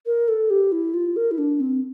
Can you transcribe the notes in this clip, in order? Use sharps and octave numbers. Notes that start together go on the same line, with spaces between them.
A#4
A4
G4
E4
F4
A#4
E4
D4
C4